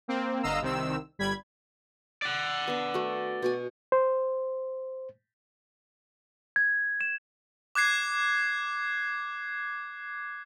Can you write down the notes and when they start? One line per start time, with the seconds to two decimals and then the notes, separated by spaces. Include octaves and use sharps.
0.08 A#3 C4
0.43 G1 D3 D#5 F5 A#5 E6
0.62 C2 D#3 C4 E6
1.19 G1 G3 B5 G#6
2.22 D5 F#5
2.68 B3 D4
2.94 A3 F#4
3.42 B2 F#4 G#5
3.92 C5
6.56 G#6
7.01 E7
7.75 D6 F#6 G#6 C7